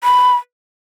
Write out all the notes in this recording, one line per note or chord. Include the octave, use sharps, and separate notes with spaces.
B5